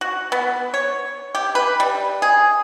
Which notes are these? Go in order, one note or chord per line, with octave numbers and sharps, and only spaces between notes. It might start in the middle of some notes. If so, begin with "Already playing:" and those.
F#4
B3
C#5
G4
B4
G3
G#4